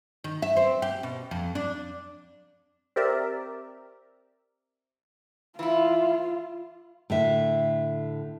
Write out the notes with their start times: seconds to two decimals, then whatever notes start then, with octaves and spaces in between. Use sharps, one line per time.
0.24 D#3
0.42 E5
0.57 C4
0.82 G4
1.03 B2
1.31 F2
1.55 D4
2.96 C4 G4 A#4 D5 E5
5.59 E3 E4 F4
7.10 A2 D3 E5